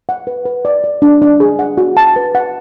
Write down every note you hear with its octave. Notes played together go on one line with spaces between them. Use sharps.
F#5
B4
B4
D5
D5
D4
D4
G#4
F#5
F#4
A5
B4
F#5